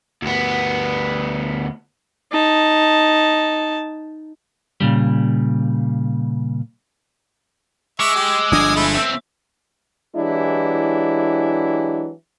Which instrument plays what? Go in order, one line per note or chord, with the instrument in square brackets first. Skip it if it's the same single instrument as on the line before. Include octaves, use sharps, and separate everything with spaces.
[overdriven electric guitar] D2 B3
[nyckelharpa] D#4 A5
[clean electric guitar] A#2 C#3 G3
[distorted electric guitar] G#3 [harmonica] E5 C#6 [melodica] D6 E6
[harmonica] G4
[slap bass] G1 F3 D4 [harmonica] G#5 D#6
[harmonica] A3 [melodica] E4
[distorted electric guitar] C#2 C4 [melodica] E5
[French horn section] E3 F#3 G#3 D4 E4 G4